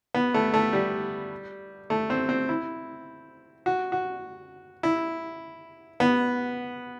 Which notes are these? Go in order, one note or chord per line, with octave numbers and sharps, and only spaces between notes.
B3
A3
A3
G3
A3
C4
C4
E4
F#4
F#4
E4
B3